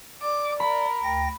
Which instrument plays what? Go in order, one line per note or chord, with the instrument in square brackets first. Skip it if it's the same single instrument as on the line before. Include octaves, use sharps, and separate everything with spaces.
[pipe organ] D5 [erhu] D6
[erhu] A#4 [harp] B5
[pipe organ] D2 G5 A#6